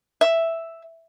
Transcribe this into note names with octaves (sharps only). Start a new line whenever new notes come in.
E5